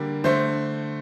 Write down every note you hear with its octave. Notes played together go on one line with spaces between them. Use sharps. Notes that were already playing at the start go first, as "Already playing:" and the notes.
Already playing: D3 G3 A#3
D3 A3 C5